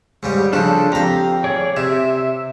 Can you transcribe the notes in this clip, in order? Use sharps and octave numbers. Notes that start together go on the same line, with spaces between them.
G#2 C#3 G3
C#3 F3 D4 A4
F2 G4 F5 A#5
G#4 C#5 D5
C3 E5